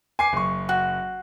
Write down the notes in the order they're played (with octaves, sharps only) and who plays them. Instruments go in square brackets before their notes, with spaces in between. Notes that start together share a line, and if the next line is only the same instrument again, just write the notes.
[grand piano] G#5 D6 C7
F#1 C#6
[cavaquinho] F#4